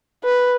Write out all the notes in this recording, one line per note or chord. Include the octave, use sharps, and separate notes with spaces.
B4